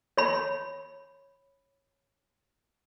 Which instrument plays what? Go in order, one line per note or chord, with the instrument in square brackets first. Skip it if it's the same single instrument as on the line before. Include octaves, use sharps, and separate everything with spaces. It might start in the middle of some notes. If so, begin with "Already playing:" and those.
[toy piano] C#5 B5